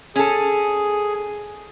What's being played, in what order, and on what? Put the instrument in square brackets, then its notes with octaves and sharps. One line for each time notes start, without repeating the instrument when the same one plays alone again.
[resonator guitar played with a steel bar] C#4 A4 [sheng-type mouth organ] G#4